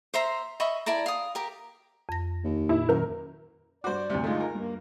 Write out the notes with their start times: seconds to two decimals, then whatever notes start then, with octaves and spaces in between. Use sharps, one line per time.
0.14 C5 E5 A#5 C6
0.60 D#5 E5 B5 C#6
0.86 E4 D5 A5 A#5
1.06 F5 D#6
1.35 G4 A#4
2.09 F2 A#6
2.44 D#2
2.69 A#2 E4
2.89 F#2 D#3 A#4 G6
3.84 G2 F#4 C5 D5 D6
4.10 D2 G2 C3
4.24 G#3 A3 D#4 F4
4.40 A#4
4.55 G2 A#3